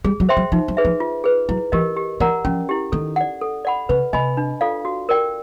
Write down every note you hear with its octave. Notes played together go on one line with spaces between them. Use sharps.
G3 G#4
F#3
C5 E5 G5 C6
F#3
F3 D#4
F#3
G#4 B4 E5
F3
F4
G#4 B4
F#3 E4
E3 G4 A#4 D#5
G4
E3 A#4 D5 F#5 A#5
F3 C#4
E4 G4
D#3 A4
D5 F#5
A4
D5 F#5 B5
C#3 B4
C3 D#5 G#5 B5
D4
F4 A4 D5 F5
F#4
A#4 D5 G5